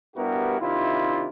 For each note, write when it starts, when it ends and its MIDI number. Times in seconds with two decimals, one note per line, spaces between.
0.16 0.60 43
0.16 0.60 59
0.16 0.60 64
0.16 0.60 66
0.16 0.60 67
0.16 0.60 70
0.60 1.29 48
0.60 1.29 51
0.60 1.29 62
0.60 1.29 64
0.60 1.29 65